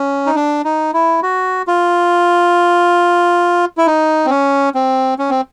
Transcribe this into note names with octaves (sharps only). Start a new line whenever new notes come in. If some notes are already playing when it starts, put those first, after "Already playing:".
Already playing: C#4
D#4
D4
D#4
E4
F#4
F4
E4
D#4
C4
C#4
C4
C#4
C4